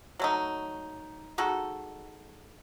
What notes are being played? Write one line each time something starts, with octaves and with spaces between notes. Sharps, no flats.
F#3 A3 D#4
G#3 D#4 F#4 A4